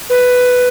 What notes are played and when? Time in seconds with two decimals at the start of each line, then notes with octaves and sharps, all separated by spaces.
0.10 B4